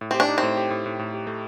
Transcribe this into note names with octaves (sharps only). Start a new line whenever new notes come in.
A2
C4 G4
D4
D#4
A2 C4
G4
A2
A2
A2
G4
A3